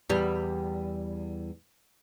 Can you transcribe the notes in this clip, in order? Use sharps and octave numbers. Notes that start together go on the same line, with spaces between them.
E2 G3